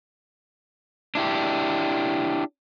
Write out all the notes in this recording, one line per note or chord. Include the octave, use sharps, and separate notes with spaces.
D4 E4 G4